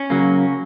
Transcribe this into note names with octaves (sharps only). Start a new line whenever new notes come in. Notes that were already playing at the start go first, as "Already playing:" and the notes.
Already playing: C#4
C#3 F#3 A#3